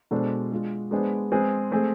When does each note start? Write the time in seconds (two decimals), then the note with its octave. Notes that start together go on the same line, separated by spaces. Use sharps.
0.11 B2 G#3 D4 A4 C5
0.51 G#3 D4 F4
0.91 G#3 B3 D4 G#4 C5
1.32 G#3 C4 G#4 B4
1.72 A3 C4 G#4